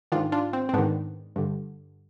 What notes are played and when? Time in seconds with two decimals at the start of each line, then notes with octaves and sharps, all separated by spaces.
0.12 G#2 D#3 D4 F4
0.32 D4 F4
0.53 C4
0.69 C4
0.74 G#2 D#3 B3 D4
1.36 G2 D3